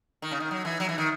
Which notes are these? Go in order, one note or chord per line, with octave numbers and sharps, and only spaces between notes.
D#3
C#3
D#3
F#3
E3
F#3
E3
D#3